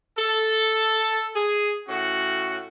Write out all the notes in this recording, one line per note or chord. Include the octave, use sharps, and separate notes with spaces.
A4
G#4
A2 C#4 F#4